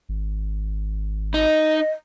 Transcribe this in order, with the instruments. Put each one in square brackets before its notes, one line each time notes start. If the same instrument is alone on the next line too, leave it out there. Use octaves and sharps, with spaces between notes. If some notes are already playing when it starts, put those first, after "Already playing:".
[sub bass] G#1
[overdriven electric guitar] D#4 [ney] D#5